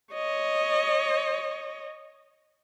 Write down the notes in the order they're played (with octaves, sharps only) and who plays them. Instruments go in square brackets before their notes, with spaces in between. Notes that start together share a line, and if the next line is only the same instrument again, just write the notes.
[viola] C#5 D#5